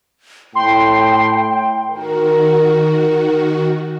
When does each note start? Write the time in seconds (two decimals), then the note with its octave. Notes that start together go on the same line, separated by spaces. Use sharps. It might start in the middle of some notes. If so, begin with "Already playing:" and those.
0.55 A2 G5 C6
1.90 D#3 F#4 A#4